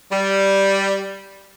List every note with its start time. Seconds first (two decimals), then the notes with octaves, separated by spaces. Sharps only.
0.10 G3